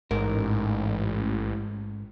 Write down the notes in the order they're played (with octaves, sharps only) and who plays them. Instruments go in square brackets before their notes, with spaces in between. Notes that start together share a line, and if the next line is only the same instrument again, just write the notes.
[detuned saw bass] A1 [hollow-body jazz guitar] G#2 A#4